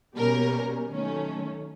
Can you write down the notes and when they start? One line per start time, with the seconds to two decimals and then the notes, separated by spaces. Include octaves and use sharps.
0.17 B2 G3 A#3 C#4 A#4
0.89 D#3 F#3 A3 C#4